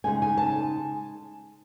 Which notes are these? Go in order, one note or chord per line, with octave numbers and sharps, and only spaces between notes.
C#3 G#3 D#4 G#5
G#5
A5